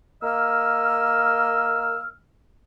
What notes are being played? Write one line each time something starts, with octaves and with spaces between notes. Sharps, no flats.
A#3 D#5 E6 F6